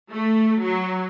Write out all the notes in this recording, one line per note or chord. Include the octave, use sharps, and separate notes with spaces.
A3
F#3